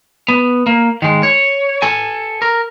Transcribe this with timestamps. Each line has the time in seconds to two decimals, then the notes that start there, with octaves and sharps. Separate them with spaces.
0.28 B3
0.66 A#3
1.02 D#3 G#3
1.23 C#5
1.82 A4 G#5
2.42 A#4